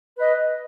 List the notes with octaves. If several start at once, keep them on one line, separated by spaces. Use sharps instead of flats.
B4 D#5